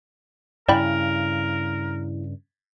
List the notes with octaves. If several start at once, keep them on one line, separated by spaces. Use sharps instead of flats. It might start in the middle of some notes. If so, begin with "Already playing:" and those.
G2 C#3 E4 A#4 D5 G5 B5